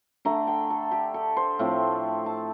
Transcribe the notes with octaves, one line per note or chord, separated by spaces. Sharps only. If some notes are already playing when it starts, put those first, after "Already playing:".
D3 A3 D4 A#5
G5
A4
G4
A4
C5
A2 F3 A3 C4
A5